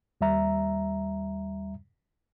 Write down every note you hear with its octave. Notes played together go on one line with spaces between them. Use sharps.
D#2 G3 E5 A#5